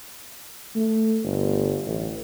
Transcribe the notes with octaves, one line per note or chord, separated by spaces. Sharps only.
A3
G1
A1